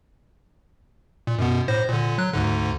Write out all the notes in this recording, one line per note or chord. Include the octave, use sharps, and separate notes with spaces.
A#2
F#2 B2 B3
A2 C5 A#6
A#2 D3
F#3 F#6
D2 G#2 D3